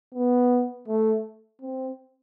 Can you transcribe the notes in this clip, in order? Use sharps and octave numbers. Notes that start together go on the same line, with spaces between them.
B3
A3
C4